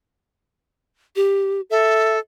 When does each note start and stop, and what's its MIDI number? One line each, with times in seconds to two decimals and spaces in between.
1.16 1.61 67
1.71 2.19 69
1.71 2.16 76